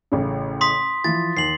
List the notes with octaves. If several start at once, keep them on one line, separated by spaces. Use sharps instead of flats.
A1 A2 C#3
C6 D#6 B6
E3 F3 A6
D#2 C7 F#7